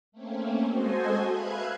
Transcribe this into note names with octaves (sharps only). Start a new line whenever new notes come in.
A3 A#3 C4 C#4
G#3 F#4 A4 C5 D#5 G#5
B4 E5 F5 F#6 G#6